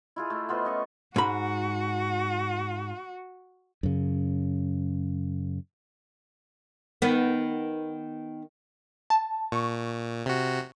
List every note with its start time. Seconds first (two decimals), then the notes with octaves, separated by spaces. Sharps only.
0.16 E4 F4 G#4
0.30 A3
0.49 B3 F4 C5 D#5
0.65 C#4 D#5 C#6
1.16 G#2 F#4 B5
3.83 F#2 C#3
7.02 D#3 B3
9.10 A5
9.52 A#2 C#6
10.26 C3 F#4